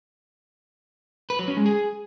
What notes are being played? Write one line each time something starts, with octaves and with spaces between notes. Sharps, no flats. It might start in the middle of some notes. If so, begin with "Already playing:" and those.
B4
F#3
C#4
G#3
G#4